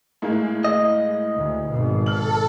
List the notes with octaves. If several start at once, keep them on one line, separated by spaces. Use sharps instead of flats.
A2 G#3 A#3
D#5
D2
G#1 B2
A4 F6 F#7